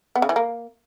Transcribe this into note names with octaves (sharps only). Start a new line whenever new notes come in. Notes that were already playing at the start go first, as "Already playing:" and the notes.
B3
C#3
E3
A#3